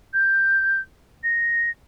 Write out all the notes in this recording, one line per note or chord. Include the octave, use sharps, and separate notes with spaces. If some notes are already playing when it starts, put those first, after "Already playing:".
G6
A#6